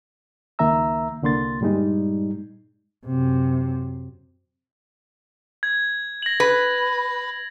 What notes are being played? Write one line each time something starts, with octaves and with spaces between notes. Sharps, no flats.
C#2 D#3 A#3 E5 A#5 E6
C2 D3 A#3 C6 A6
G2 A#2 G3 G#3 D#4
F#2 C3
G#6
A#6 F#7
B4